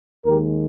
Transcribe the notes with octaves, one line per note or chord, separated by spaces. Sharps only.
D#2 D#3 G#3 G4 A#4